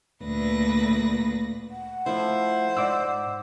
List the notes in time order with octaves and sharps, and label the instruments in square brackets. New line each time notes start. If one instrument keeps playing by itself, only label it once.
[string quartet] D2 A#2 B4 A#6
[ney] F#5
[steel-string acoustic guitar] F3 A3 E4 [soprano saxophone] C5
[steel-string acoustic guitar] G#2 [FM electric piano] D5 D6 E6